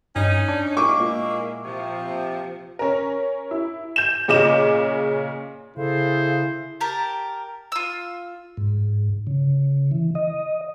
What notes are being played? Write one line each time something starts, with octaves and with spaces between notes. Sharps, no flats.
G2 C#4 D#4
D4
G#3 A#3 E4 C#6 D6
A#2
C3 F3
C#4 A#4
E4
G6 E7
A#2 C#3 D#5 D6 E7
C#3 E4 G#4 A4 C5 F5
G4 A#4 A5
F4 E6
G#2
C#3
E3
D#5